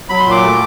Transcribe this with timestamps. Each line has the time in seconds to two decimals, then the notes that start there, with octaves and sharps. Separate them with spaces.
0.09 F#3 B5
0.20 C6
0.25 A#2
0.31 D6
0.43 A3